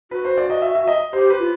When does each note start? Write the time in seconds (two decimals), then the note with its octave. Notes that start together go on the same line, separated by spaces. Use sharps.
0.11 F#4 B4
0.25 C5
0.37 D5
0.50 D#5
0.62 E5
0.75 E5
0.87 D#5
1.13 G4 C5
1.30 B4
1.40 F4